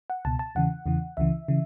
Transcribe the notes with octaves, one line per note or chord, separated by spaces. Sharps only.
F#5
C#2 B2 A5
A5
E2 C#3 E3 F#5
E2 C#3 E3
C#2 C#3 E3 E5
C#3 E3